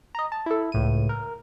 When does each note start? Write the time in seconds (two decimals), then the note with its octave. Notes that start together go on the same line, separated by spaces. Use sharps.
0.15 D#5 A#5
0.32 A5
0.46 E4 A4
0.72 C#2 A2 D#7
1.09 A#4